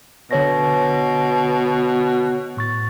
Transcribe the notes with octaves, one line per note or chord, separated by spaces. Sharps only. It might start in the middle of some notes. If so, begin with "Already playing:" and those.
B2 D3 C#5 A#6
A2 C#6 A6